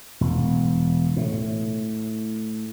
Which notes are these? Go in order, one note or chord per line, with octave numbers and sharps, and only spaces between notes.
E1
A2